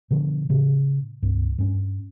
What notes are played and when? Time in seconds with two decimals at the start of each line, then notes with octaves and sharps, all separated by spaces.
0.11 B2 D3 F3
0.49 A2 C#3
1.22 C#2 G2
1.58 G2 C#4